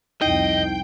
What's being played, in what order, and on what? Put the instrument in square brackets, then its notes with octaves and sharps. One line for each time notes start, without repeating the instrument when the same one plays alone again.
[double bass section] C2 F2 [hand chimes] D#4 E4 C7 [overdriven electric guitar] D#5 [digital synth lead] G5